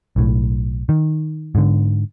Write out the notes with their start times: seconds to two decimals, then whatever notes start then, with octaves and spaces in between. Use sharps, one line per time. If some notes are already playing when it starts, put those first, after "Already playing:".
0.16 B1 A2
0.89 D#3
1.55 G#2 D3